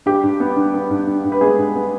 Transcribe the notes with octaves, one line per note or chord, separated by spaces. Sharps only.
G2 G4
G2
B3
G2
B3
G2
G2
G2
B4
G#3 B3 G#4
G2
B3